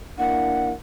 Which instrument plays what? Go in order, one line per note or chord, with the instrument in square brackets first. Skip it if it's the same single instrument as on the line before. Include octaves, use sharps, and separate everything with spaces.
[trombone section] A#3 D4 E4 [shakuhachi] F#5